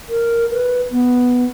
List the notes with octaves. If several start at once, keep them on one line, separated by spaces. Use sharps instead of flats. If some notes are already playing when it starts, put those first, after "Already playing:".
A#4
B4
B3